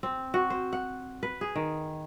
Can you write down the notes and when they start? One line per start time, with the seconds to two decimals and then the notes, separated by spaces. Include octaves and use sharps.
0.03 C4
0.34 F#4
0.50 C5
0.73 F#5
1.23 B4
1.41 G#4
1.55 D#3